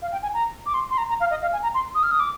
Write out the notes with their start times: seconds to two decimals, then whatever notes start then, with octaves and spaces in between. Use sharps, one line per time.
0.02 F5
0.12 G5
0.22 G#5
0.34 A#5
0.66 D6
0.74 C6
0.90 C6
0.98 A#5
1.09 A#5
1.20 F5
1.30 D#5
1.42 F5
1.53 G#5
1.63 A#5
1.74 C6
1.95 D#6
2.03 F6
2.11 D#6
2.20 D6